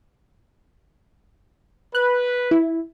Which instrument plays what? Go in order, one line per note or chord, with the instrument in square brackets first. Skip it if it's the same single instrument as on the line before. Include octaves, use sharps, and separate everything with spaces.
[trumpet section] B4 [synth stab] F#6
[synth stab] E4